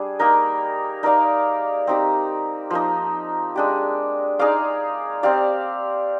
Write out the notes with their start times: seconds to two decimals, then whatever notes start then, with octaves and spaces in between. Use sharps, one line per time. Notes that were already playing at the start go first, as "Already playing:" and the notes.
Already playing: G3 D4 G#4
0.19 A#3 D#4 A#4
1.03 D#4 A#4 D5 F5
1.87 C4 D#4 G4
2.70 F3 A#3 D#4
3.55 G#3 D4 G4
4.39 D#4 G#4 D5 F5
5.23 C4 G4 D5 F5